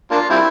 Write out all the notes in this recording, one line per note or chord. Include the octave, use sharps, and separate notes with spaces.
A#3 D4 F4
G3 C4 E4